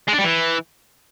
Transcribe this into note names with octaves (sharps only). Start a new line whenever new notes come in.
G#3
D4
G3
E3